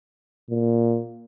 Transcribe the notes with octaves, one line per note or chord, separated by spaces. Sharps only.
A#2